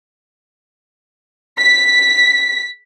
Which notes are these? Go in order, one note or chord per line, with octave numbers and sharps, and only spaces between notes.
B6